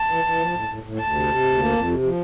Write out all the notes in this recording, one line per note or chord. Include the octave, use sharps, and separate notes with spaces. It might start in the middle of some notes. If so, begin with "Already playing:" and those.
Already playing: A5
E3
E3
F3
A2
A2
A2
D2 A5
C3
C3
D2
A#3
F2
C3
F3